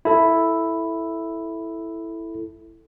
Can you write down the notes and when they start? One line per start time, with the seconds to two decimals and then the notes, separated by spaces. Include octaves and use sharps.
0.05 E4 A4